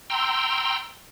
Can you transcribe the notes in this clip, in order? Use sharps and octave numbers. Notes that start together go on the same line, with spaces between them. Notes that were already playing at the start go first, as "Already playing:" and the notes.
G5 A#5 C6 E6